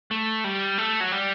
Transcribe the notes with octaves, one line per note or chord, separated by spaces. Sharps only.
A3
G3
A3
F#3
G3